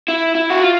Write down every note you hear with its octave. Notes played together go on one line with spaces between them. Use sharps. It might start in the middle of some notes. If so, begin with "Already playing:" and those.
E4
E4
F#4
F4